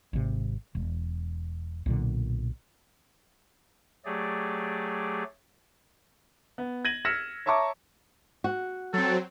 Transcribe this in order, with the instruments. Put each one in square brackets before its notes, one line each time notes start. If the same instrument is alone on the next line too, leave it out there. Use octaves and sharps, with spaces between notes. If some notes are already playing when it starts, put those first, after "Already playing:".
[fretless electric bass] G#1 C3
E1
B1 A#2 D3
[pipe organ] F#3 A3 G4 G#4 D5
[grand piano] B3
G#6 A#6 D#7 F#7
E6 F6 A#6 B6 C#7 E7
C#5 E5 A5 A#5 C#6 D6
[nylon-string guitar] F#4
[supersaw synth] F#3 C4 [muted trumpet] A4